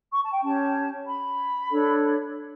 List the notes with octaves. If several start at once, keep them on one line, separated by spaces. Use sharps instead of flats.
C#6
A5
G5
C#4 G4 C#5 A5
B5
D4 A4 C#5